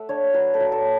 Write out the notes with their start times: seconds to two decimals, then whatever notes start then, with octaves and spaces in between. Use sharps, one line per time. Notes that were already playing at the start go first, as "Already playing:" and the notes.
Already playing: A3 E5 F#5
0.09 D4 C#5
0.34 F#3 B4
0.54 A4
0.60 F#3
0.72 A4